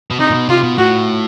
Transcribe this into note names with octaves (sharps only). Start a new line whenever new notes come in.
B2
C3 D#4
A#2
B2
C3 F4
B2
A2 F#4